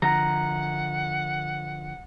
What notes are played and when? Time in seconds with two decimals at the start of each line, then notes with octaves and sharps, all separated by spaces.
0.02 D3 F3 F#5 A#5